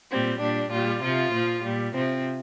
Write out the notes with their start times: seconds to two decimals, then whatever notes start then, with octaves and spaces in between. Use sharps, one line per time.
0.10 A#2 G3 C4
0.41 A#2 G3 D4
0.71 A#2 G3 F4
1.02 C3 F3 F4
1.32 A#2 F3
1.63 A#2 G3
1.93 C3 F3 C4